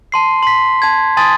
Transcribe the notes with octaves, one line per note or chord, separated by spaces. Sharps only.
A5 C6 C7
C6 B6
A5 G#6
G#5 A5 C6 D#6 A6